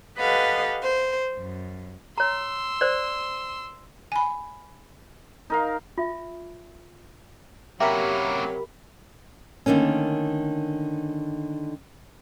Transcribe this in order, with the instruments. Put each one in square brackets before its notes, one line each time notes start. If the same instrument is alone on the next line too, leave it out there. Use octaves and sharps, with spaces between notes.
[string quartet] G4 A4 B4 D#5 F5 F#5
C5
F#2
[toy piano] C#5 A#5 [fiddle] C6 E6
[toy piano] C5 D5
[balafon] G#5 B5
[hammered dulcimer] D#4 A#4 F5
[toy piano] F4 E5
[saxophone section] C3 F#3 [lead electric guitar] A#3 C#4 [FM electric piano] G4 A#4 B5 [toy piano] E5
[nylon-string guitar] D3 D#3 A3 A#3 C#4